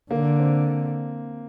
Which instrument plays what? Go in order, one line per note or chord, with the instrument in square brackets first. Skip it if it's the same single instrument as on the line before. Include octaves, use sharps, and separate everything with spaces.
[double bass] D3 [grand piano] A#3
[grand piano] C4